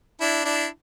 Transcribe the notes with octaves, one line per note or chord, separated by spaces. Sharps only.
D4 E4
D4 E4